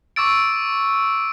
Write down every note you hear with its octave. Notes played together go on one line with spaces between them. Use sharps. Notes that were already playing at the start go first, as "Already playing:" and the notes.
C#6 D6 E6 A6 D7